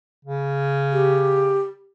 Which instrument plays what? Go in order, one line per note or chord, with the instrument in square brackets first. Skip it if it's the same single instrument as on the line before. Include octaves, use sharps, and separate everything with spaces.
[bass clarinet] C#3
[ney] G4